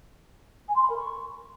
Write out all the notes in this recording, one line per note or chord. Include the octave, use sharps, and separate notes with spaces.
G#5
C6
B5
A#4
C#6